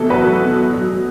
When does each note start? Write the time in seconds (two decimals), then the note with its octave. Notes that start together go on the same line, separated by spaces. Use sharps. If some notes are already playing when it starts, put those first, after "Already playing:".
Already playing: B2 E3 A4
0.10 F#3 F#4 B4
0.25 F#3
0.42 B2
0.56 F#3
0.73 F#3
0.89 F#3